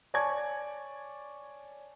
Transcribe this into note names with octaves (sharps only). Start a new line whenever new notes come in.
C#5 D5 G#5 A5 C#6 G#6